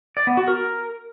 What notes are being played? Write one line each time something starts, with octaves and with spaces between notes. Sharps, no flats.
D5
B3
F#4
A#4